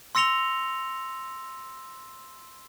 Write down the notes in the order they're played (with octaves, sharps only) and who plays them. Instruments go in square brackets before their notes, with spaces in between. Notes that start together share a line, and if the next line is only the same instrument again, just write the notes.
[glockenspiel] C6 E6 A#6 C#7 F7 G7